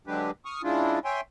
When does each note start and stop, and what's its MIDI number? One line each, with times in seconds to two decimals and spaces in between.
0.07 0.31 50
0.07 0.31 54
0.07 0.31 56
0.07 0.31 62
0.07 0.31 67
0.07 0.31 71
0.45 0.62 85
0.45 0.62 87
0.45 0.62 89
0.63 0.99 49
0.63 0.99 56
0.63 0.99 62
0.63 0.99 64
0.63 0.99 65
1.05 1.21 73
1.05 1.21 76
1.05 1.21 79
1.05 1.21 80
1.05 1.21 84